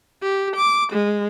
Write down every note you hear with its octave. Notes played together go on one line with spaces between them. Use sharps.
G4
D6
G#3